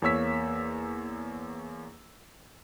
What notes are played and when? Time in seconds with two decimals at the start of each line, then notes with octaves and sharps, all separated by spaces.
0.02 E2 A#3 C#5 E6 B6